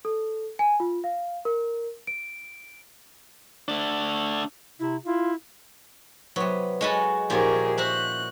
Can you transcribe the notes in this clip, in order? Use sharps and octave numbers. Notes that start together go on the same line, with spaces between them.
A4
G#5
F4
F5
A#4
D7
A3 D4
C3 E4
E4 F4
C3 F#3 B3
G#3 F#4 A4 B4 C#5
A#2 D#3 F3 G4 G#4 A#4 C#5
F#4 C5 E5 F#6